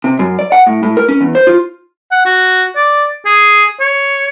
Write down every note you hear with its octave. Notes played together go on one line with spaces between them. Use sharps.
C3
F#2
D5
F#5
A2
A2
A#4
C#4
E2
C5
F4
F#5
F#4
D5
G#4
C#5